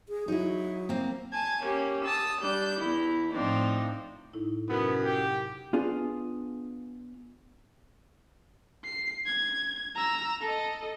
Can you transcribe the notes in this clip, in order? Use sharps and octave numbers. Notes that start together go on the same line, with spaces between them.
G#4
F#3 D#4 E4
A#3 C4
G#5 A5 G#6
A#3 C#4 G4
A5 D#6 E6
G3 D4 G6
E2 E4
A2 F3 C4 D4 D#4
A2 D#4 E4
F#2 C3 B3
G4
B3 D4 F4 G#4
C7
G#6
A#5 E6
A4 D#5